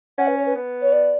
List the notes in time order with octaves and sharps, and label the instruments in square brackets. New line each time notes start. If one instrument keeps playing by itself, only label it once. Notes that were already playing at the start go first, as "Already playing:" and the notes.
[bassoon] C#4 [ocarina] F#5
[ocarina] B4
C#5
B4
[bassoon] B3
[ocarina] C#5
D5